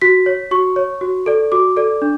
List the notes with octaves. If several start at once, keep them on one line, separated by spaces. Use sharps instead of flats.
F#4 B6
C#5
F#4 C#6
C#5
F#4
A4 D5
F#4 D6
A4 D5
D4